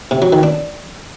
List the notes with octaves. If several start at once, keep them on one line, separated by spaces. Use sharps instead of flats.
C3
F#3
D#3
D4